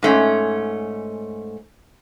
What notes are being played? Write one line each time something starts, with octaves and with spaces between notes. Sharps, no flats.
G#2 A3 C#4